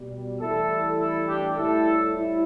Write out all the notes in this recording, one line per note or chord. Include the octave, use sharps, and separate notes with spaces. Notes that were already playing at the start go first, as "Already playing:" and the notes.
Already playing: B2 G3
A2 E3 G3 E4 A4
E4 A4
D4 G4
A2 G3 E4 A4
E4